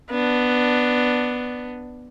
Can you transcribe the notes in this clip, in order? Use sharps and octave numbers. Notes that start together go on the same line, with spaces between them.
B3 D4